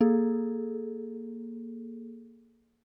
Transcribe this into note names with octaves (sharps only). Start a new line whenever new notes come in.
A#3 G#4 A4